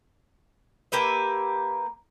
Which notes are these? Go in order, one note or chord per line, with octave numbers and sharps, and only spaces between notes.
A#3 G4 B4 E5